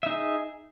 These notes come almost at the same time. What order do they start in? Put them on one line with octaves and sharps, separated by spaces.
E5 D#4 G#4